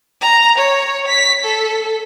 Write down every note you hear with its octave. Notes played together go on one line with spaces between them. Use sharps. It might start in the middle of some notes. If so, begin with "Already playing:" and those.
A#5
C#5
B6
A4